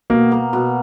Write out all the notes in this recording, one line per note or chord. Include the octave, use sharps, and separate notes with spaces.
B2 A#3
A#3
B2